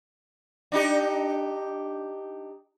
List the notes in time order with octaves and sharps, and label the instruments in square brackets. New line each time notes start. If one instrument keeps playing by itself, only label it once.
[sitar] D4 D#4 G4